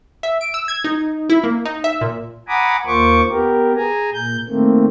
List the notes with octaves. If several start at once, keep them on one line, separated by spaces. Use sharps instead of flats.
E5
D7
E6
G#6
D#4
E4
A#3
D#4
E5
A#2
F#5 G#5 A#5 B5 D6 D#6
D#2 A#3 F4 C5 C#6 D6
B3 G4 A#4
G#4 G#5 A#5
A#2 G6
D#3 A3 A#3 C4